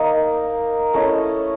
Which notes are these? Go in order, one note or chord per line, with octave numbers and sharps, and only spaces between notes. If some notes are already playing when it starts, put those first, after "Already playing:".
Already playing: A#3 D#4
A3 C#4 E4 C#5 D#5